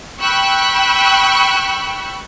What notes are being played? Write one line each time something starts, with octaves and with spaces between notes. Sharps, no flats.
G5 B5 C#6 E6 F#6